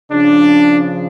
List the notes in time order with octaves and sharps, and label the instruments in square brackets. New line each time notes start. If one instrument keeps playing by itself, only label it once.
[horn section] C#3 F3 D4